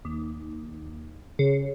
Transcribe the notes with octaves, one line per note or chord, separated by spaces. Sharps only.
D#2
C#3